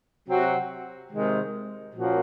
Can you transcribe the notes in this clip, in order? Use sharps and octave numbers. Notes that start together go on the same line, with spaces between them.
C3 F#3 C4 F#4
C3 D#3 G#3
A#2 F3 A#3 C#4 F#4